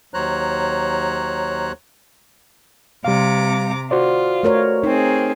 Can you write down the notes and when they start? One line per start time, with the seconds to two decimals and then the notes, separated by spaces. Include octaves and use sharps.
0.14 D#2 F#3 C5 C#5 A#5 F#6
3.05 C3 G3 F5 A#5 D6
3.91 F4 F#4 C5 D5
4.43 A3 A#4 C#5
4.84 C4 D#4 G#4